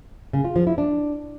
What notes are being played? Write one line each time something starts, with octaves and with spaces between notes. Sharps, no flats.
C#3
F4
F3
E4
D4